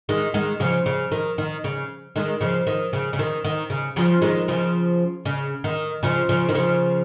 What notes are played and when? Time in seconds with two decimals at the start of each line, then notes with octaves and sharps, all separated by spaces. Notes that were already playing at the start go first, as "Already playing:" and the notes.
0.09 D#3 G#3
0.34 D#3 G#3
0.60 C#3 F3
0.86 C#3
1.12 D#3
1.38 D#3
1.64 C#3
2.16 D#3 G#3
2.41 C#3 F3
2.67 D#3
2.93 C#3
3.13 C#3
3.19 D#3
3.44 D#3
3.70 C#3
3.96 C#3 F3
4.22 D#3 G#3
4.48 C#3 F3
5.25 C#3
5.64 D#3
6.03 C#3 F3
6.29 C#3 F3
6.49 D#3
6.55 C#3 F3